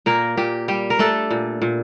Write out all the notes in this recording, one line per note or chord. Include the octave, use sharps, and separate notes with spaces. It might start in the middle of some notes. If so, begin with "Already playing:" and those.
A#2 A#3 A#4
A#2 G4
G3 G4
A#4
A3 D4 A4
A#2
A#2